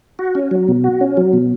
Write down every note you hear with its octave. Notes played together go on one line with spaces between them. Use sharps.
F#4
C#4
F#3
B2
F#4
C#4
F#3
B2